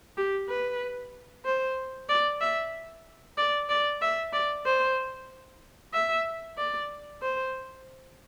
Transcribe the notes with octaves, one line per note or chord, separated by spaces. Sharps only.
G4
B4
C5
D5
E5
D5
D5
E5
D5
C5
E5
D5
C5